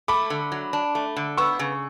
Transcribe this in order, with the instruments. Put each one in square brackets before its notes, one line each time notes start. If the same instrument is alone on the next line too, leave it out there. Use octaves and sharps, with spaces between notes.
[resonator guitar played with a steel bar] A3 [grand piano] B5 D6
[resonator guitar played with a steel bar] D3
F#3
D4
A3
D3
[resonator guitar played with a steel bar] B3 [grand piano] C#6 E6
[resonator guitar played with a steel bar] C#3